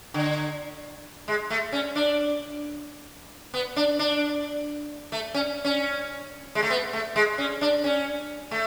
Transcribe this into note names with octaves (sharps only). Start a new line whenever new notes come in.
D3
G#3
A3
C#4
D4
B3
D4
D4
A3
C#4
C#4
G#3
A3
B3
A3
G#3
C#4
D4
C#4
A3